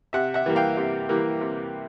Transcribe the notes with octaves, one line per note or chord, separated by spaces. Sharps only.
C3 E5 F#5
E5 F#5
E3 G3 A#3
F5 G5
C3
E3 G3 A#3
C3